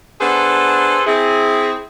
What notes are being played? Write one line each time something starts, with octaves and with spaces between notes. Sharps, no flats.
B3 D4 G#4 A4 B4 C5
C4 E4 G#4